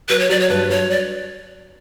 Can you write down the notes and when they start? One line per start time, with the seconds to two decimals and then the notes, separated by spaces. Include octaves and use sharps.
0.09 F#3 B4
0.20 C#5
0.29 F#3 D5
0.40 C#5
0.49 G2 B4
0.70 F#3 C#5
0.90 D5